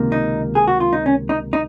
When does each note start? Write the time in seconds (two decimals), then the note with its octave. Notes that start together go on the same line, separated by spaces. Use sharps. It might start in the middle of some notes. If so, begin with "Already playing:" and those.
Already playing: C#2 C3 D#3 A#3
0.12 D#4
0.55 G#4
0.68 F#4
0.80 F4
0.93 D#4
1.06 C#4
1.29 D#4
1.53 D#4